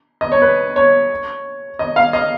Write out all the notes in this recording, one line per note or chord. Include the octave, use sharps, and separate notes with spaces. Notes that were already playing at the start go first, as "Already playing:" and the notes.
D#5
C#5
B4
C#5
D#5
F5
D#5